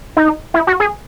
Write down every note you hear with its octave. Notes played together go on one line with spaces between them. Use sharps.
D#4
E4
F#4
G#4